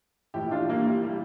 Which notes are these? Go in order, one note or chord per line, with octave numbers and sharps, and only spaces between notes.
A#1 A2 E3 E4 G4
D4 F4
G3 A#3
G3
G3